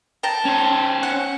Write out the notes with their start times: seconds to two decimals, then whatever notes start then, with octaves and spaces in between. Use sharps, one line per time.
0.23 G5 A5 A#5
0.46 C#4 C5
1.03 F#5